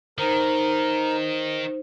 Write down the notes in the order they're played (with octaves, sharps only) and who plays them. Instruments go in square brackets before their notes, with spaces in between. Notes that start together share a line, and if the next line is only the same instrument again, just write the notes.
[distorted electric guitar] D#3 [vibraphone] D#4 C5 [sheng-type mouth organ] A#4